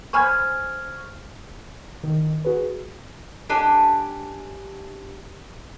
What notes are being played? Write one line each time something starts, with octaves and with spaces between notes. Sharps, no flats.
C5 G#5 B5 C#6 F6 G#6
D#3
F#4 G#4 B4
D4 G4 G#5